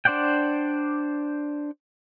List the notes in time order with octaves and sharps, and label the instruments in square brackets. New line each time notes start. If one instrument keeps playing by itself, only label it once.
[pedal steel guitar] D4 C5 D5 F#5 G5